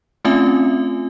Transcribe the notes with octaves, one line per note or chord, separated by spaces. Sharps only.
A3 C4 C#4 F4 E5 G#5